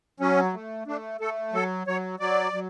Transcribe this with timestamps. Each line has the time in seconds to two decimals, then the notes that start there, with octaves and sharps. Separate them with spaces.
0.20 F#3 C#4
0.53 A3
0.87 A3 D4
1.20 A3 A4
1.53 F#3 A4
1.87 F#3 C#5
2.20 F#3 D5
2.53 F#3